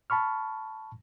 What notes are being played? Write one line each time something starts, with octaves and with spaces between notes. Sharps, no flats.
A5 B5 C#6 F6